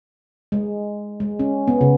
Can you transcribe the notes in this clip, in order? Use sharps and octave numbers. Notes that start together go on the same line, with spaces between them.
G#3
G#3
C#4
B3
C#3